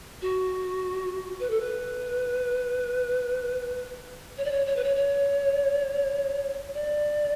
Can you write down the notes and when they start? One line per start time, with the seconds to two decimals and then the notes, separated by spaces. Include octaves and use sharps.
0.22 F#4
1.40 B4
1.50 A4
1.60 B4
4.37 C#5
4.45 D5
4.51 C#5
4.66 C#5
4.76 B4
4.84 C#5
4.96 C#5
6.74 D5